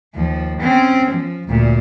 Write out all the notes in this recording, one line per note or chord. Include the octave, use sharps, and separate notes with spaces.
D#2 F3
C4 C#4
F3
D2 A#2